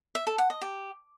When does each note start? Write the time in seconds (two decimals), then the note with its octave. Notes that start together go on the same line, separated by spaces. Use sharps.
0.15 E5
0.27 A4
0.38 F#5
0.50 D#5
0.62 G4